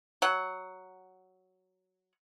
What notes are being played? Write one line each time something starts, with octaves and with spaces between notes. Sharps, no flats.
F#3 F#5